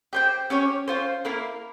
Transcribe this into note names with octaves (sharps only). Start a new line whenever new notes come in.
G4 C5 G5
C#4 G4 C#5
C#4 F4 C5
A#3 E4 A#4 F5